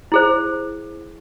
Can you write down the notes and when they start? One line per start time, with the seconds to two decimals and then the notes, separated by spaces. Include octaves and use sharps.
0.12 E4 G#4 C5